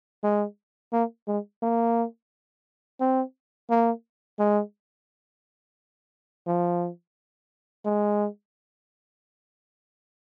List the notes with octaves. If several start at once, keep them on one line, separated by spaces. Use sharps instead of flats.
G#3
A#3
G#3
A#3
C4
A#3
G#3
F3
G#3